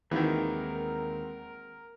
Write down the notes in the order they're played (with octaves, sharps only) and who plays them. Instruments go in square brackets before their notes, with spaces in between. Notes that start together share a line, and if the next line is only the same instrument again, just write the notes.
[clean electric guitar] D#2 [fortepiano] D#3 E3 [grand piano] G#3 C4 F#4 [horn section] A#4